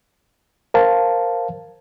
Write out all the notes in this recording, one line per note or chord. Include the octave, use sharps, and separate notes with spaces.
A#4 C5 F5 A5